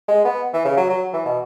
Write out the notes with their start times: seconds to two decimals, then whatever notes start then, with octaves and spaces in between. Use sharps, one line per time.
0.08 G#3
0.25 B3
0.53 E3
0.65 C#3
0.77 F#3
0.89 F#3
1.13 E3
1.25 B2